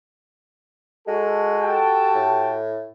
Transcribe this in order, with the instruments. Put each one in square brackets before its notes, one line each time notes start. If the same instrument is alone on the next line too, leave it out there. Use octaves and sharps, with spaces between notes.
[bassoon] G#3 [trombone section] F#4 A4
[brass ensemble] G4 G5 A5
[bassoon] A2